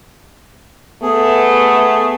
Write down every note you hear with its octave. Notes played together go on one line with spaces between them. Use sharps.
A3 B3 G#4